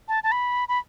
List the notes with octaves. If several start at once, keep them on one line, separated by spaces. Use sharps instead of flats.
A5
A5
B5
B5